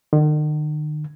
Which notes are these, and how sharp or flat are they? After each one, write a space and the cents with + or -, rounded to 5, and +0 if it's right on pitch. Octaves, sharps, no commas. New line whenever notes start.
D#3 -45